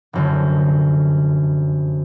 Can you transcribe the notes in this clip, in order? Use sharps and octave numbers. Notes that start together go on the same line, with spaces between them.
F1 F#2 D3